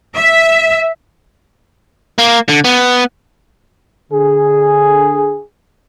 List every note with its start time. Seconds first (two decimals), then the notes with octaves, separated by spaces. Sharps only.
0.15 E5
2.18 A#3
2.49 D3
2.64 B3
4.11 D3 G#4